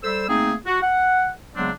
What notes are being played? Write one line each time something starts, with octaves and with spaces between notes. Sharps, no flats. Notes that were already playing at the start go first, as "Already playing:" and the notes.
G3 A4 C5 E6
A3 A#3 C4 D#4 G#4
F#4
F#5
C#3 F#3 G#3 B3 C4 D4